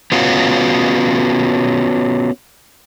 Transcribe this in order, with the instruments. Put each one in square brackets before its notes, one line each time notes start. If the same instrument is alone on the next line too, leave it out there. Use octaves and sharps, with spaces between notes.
[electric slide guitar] B3 C#4 F4 F#4